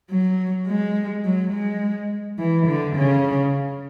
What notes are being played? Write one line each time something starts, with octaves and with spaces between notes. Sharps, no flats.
F#3
G#3
F#3
G#3
E3
D3
C#3